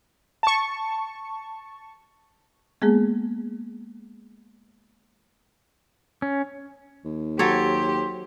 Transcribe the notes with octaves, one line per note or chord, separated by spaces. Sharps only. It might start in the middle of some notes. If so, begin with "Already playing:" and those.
A5 C#6
G#3 A#3 B3 G#4
C#4
D#2
F#3 G4 A4 C5 C#5